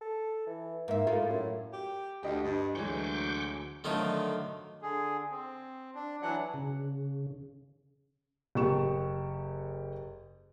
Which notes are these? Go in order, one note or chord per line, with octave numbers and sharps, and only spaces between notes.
A4
E3
G#2 A#3 E5
A2 F4 A4 A#4
F#2
G4
D2 G4 D#5
G2
D2 E3 F#3 G#3 C#6 D6 G6
D3 D#3 F3 F#3 A3 F4
D3 G#4
C4
D4
E3 F#3 D4 F#5
C#3
F#1 G4 C#6 E7